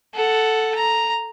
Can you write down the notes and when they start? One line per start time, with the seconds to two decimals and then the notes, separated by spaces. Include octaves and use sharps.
0.14 A4 F#5
0.75 A#5